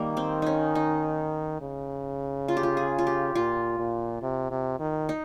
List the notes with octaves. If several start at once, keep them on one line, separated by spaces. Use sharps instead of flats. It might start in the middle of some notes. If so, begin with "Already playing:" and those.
Already playing: D#3 G3 A#3
C4
C#4 D#4
D#4
C#3
F4
G4
F4
G#4
F4
G4
A#2 F4
A#2
C3
C3
D#3
D#4